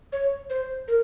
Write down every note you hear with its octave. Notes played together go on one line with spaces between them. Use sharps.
C#5
C5
A#4